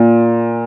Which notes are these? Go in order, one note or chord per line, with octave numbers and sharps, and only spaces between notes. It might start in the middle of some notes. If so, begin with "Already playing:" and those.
Already playing: A#2